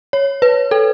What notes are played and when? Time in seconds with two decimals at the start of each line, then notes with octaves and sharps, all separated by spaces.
0.13 C#5
0.42 B4
0.71 A4